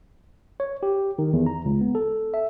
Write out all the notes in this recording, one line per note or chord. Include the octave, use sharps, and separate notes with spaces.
C#5
G4
D#3
E2
A#5
C#2
B3
A4
E5